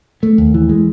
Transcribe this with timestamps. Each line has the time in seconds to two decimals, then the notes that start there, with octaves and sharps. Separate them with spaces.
0.23 A3
0.38 D#2
0.54 E3
0.69 G#3